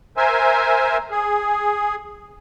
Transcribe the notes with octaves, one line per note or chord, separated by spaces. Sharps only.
A#4 C5 E5 G#5
G#4